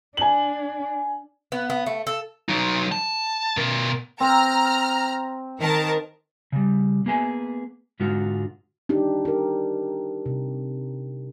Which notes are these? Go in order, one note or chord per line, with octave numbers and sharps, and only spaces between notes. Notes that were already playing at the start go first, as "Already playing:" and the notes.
D4 G#5 F#7
B3
B3
A3
A4
F#3 D#4
A5
B2 A#4
C4 A#5 F6
D#3 A#4 A5
C#3 G3
A#3 B3 G#4 G#5
G#2 D3 G#3 F4 F#4
D4 D#4 G4
G4 A#4
C3